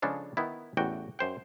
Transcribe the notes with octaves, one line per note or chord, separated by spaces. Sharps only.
C#3 F3 G#3 D4 A4
D#3 B3 E4
A1 E2 A3 F#4 G4 G5
F#2 C5 G5